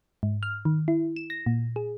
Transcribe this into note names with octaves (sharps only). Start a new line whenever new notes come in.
G#2
F6
D#3
E4
E7
A#6
A#2
G#4